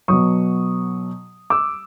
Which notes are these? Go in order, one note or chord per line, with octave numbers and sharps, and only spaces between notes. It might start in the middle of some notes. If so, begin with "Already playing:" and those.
B2 F#3 C#6 D#6
D6 E6